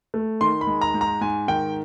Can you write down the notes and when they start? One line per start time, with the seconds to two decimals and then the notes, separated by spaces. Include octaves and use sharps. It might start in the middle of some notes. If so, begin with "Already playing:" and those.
0.14 A3
0.41 D#3 C6
0.61 B5
0.67 G#3
0.81 A#5
0.94 G#2
1.01 A#5
1.21 G#2 G#5
1.48 D#3 G5